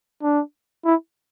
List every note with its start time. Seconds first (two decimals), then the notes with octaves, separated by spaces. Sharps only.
0.23 D4
0.85 E4